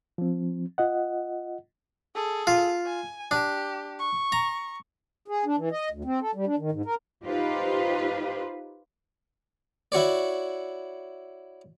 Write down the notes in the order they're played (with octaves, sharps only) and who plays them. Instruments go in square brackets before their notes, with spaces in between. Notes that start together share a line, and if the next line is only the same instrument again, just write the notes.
[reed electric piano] F3 C4
F4 D#5 F#5
[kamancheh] G#4 A4
[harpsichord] F4
[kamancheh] G#5
[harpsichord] D4 [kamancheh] G4
[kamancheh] C#6
[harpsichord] A#5
[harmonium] G#4
D4
E3
D#5
D2
C4
A4
G3
D4
D#3
G#2
A#4
[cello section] D#4 F4 G4 B4 C5
[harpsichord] E4 F#4 C#5 D5